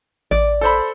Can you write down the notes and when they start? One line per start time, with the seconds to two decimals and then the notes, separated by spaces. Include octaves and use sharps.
0.31 A1 D5
0.61 A4 C5 B5